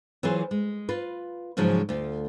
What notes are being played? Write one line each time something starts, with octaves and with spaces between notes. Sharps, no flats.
E3 F#3 F4 G#4 B4 C5
G#3
F4 B4
G#2 C#3 F3 F#3 G#3
D2 F4